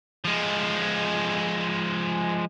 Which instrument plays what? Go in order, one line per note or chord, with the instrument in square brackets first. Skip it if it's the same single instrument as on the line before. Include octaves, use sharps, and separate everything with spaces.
[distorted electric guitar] F3 G#3